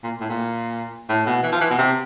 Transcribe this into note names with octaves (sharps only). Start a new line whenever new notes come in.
A#2
A2
A#2
A2
B2
E3
F3
E3
B2
C3